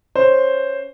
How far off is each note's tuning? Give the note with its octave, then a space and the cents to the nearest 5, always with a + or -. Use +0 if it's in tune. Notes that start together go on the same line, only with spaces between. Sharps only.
C#4 +0 C5 +0